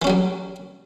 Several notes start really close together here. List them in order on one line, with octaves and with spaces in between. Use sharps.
E3 C#4 F#3 G3